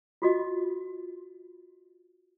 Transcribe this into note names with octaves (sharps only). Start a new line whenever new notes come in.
F4 F#4 D#5